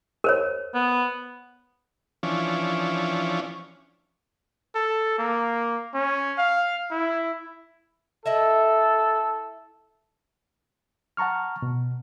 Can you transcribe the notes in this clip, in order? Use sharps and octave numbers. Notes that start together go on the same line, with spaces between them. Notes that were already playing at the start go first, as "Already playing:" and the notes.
A#4 C5 C#5
B3
E3 F3 C#4 D4
A4
A#3
C#4
F5
E4
E4 A4 D#5 E5
F#5 A5 A#5 C#6 F6
B2